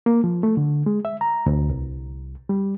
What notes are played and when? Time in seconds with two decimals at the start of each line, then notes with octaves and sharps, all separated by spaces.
0.06 A#3
0.24 F3
0.43 A3
0.57 D3
0.86 G#3
1.05 E5
1.21 A#5
1.46 D2
1.70 C2
2.49 G3